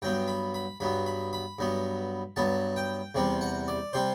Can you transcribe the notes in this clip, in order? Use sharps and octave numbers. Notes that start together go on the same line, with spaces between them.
G2 F#3 B3 G5
B5
B5
G2 F#3 B3 B5
B5
B5
G2 F#3 B3
G2 F#3 B3 A5
G5
E2 C3 G3 C4
F#5
D5
C3 G3 C4 C5